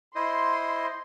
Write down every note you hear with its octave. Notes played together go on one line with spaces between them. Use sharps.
E4 C5 D#5 C6